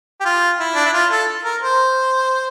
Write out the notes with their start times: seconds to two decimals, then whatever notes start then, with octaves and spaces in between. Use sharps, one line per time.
0.21 G4
0.25 F4
0.60 E4
0.75 D4
0.85 E4
0.94 F4
1.11 A4
1.45 A#4
1.62 C5